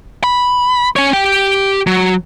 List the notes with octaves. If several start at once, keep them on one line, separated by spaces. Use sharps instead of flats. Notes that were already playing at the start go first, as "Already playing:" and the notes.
B5
C#4 C#5
G4 G5
F#3